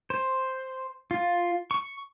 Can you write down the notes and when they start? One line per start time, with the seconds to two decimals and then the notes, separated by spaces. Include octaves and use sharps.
0.10 C5
1.11 F4
1.71 C#6